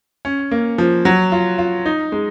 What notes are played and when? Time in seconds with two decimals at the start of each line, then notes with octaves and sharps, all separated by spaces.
0.25 C#4
0.51 A#3
0.78 F3
1.05 F#3
1.32 F4
1.58 F4
1.86 D#4
2.12 G#3